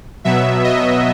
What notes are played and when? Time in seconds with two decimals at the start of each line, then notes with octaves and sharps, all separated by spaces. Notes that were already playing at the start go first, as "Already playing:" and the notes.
0.24 B2 F#3 B3 E5
0.64 D#5